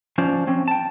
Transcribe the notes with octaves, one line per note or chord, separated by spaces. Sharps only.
F3 C#4 C5 D5
F3 C4 C#4
G5 A5